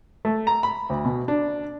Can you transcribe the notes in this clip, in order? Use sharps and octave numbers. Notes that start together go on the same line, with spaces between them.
A3
A#5
B5
D2
B2
D4